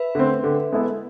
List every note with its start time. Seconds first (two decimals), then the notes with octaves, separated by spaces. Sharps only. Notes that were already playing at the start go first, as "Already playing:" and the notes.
Already playing: B4 E5
0.15 D3 A3 C4
0.44 D3
0.72 G#3 B3 E4 A4